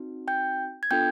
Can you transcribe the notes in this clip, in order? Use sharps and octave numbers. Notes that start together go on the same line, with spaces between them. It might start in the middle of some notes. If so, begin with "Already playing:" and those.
Already playing: C4 D#4 F#4
G5 G6
G#6
B3 D4 F4 A4 G5 G6